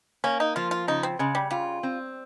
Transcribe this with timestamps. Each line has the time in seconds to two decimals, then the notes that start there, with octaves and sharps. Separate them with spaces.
0.24 A#3 C#4
0.40 D#4
0.56 F3 F4
0.71 F4
0.88 C#3 D#4
1.03 C4
1.19 C#3 G#3
1.35 G3
1.51 G3 F4
1.83 C4